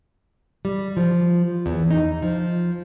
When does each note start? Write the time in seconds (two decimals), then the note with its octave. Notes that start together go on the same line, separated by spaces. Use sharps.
0.65 G3
0.97 F3
1.66 E2
1.91 D#4
2.22 F3